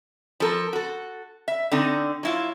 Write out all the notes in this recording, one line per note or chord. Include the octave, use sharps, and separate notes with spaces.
F3 A4 A#4
F#4 A4
E5
D3 C4 D#4
F#3 E4 F4